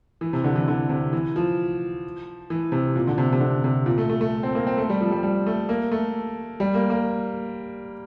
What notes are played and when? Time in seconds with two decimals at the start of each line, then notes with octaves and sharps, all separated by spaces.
0.21 E3
0.33 C3
0.44 D3
0.56 E3
0.68 D3
0.89 C3
1.13 E3
1.36 F3
2.50 E3
2.72 C3
2.96 A#2
3.07 D3
3.18 C3
3.32 C3
3.40 D3
3.64 C3
3.86 A#2
3.98 A3
4.10 A3
4.21 A3
4.43 C4
4.55 A#3
4.67 C4
4.77 A3
4.90 G3
5.01 F3
5.11 G3
5.23 G3
5.47 A3
5.69 A#3
5.92 A3
6.60 G3
6.75 A#3
6.90 A#3